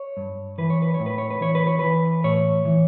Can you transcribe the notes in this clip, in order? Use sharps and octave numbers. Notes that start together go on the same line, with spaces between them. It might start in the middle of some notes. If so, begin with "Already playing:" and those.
Already playing: C#5
G2
E3 B4
C#5
B4
C#5
A2
B4
C#5
B4
E3 C#5
B4
C#5
E3 B4
A2 C#5
E3